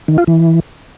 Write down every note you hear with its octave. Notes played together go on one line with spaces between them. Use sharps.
D#3
F4
E3